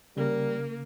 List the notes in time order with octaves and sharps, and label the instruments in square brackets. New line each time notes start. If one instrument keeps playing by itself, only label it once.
[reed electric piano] C#3 [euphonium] G3 [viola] A#3 [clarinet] A#4